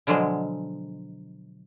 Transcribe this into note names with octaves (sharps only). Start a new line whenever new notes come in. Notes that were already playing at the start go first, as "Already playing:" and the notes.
B2 D3 F3 F#3 G#3